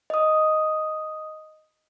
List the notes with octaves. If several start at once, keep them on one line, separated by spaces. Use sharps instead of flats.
D#5 D#6